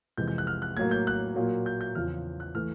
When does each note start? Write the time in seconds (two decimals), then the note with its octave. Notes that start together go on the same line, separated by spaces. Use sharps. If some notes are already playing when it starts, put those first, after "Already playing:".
0.18 F2 C3 E3 G#3 G6
0.28 G6
0.38 F#6
0.47 F6
0.62 F#6
0.77 A2 F#3 A#3 G#6
0.91 G6
1.07 F#6
1.36 A#2 F#3 A#3
1.66 G6
1.81 G6
1.95 E2 C#3 F3 F6
2.40 F#6
2.55 E3 A3 F6